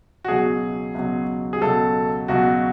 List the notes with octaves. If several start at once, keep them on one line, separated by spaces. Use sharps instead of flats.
F#4
C#2 B2 F#3 G#4
C#2 B2 F#3
G#4
C#2 B2 F#3 A4
C#2 B2 F#3 F#4